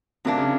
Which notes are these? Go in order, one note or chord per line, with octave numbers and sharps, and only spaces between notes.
C3 F#3 A#3 D4
C#3